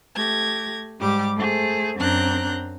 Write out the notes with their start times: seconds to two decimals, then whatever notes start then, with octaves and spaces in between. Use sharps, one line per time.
0.16 A3 G4 G#6 A#6
1.00 G#2 G3 G4 D6
1.37 A3 G#4 C5
1.98 F#2 C4 D4 A#5 F#6 G6